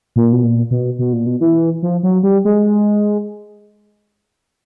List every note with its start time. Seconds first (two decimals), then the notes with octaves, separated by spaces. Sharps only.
0.16 A#2
0.32 B2
0.43 A#2
0.71 B2
0.99 B2
1.13 A#2
1.26 B2
1.41 E3
1.82 F3
2.03 F#3
2.23 G3
2.45 G#3